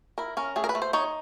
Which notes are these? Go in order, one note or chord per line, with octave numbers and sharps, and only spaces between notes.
E4 A#4
C#4 A#4
A3 G#4
A#4
B4
A3
C5
D#4 C#5